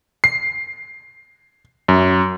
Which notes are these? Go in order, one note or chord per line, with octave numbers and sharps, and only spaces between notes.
C7
F#2